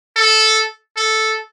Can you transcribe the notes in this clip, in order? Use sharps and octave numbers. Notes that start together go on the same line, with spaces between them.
A4
A4